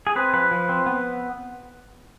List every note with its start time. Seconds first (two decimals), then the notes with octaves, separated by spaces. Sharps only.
0.07 G#4
0.16 C4 B4
0.34 F3 B4
0.51 F3
0.69 C4
0.86 B3